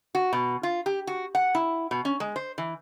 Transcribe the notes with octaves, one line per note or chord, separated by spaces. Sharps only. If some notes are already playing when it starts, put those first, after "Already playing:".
F#4
B2
F4
G4
F#4
F#5
E4
B2
C#4
G#3
C5
E3